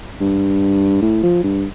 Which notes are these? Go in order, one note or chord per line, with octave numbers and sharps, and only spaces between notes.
G2
A2
F3
G2